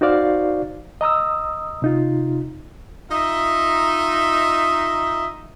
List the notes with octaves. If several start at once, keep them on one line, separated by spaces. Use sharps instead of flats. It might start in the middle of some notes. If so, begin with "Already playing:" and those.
D#4 F#4 C5 D5 F5
D#5 A#5 D#6 E6
C3 D#4 F4
D#4 F4 D#5 E5 A#5